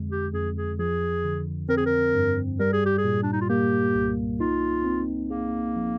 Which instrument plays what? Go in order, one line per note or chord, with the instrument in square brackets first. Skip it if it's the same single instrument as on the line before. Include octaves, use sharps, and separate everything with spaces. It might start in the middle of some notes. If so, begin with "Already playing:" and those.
Already playing: [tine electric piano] F2 D3 G#3
[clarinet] G4
[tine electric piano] F2 [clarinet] G#4
[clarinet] G#4
[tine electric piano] F3 [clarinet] G#4
[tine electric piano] D3
[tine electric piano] C4 [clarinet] A#4
[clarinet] G#4
A#4
[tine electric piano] G2
[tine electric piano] G3 [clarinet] A#4
[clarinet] G#4
G4
G#4
[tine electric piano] A#2
[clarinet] D4
D#4
F4
[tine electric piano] A#3 [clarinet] G4
[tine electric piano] C2
[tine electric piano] D#4 [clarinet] F4
[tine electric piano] C4
[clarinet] A#3 [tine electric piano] G#4
[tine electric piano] F3